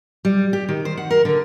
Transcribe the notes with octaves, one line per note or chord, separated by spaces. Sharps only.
G3
G4
D#3
C5
F#5
A#4
D3